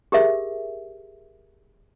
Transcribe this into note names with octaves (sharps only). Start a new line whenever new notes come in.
G4 G#4 A#4 E5